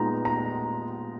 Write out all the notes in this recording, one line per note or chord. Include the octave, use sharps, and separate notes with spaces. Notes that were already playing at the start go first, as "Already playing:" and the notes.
Already playing: A#2 G#3 B3 D#4 A#5
A#5